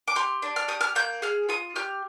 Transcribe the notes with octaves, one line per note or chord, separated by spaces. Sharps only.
D6
G4 C6
D4
F6
G4 D#6
F6
A#3 G6
G#4 F6
F4 D#6
G4 F6